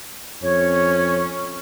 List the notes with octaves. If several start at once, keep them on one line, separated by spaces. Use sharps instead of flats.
F2 C#4 C#5